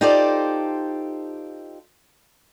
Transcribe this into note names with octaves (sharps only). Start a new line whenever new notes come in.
D#4 F4 G4 A4 C5 D5